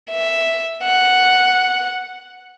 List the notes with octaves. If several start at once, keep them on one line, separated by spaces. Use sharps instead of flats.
E5
F#5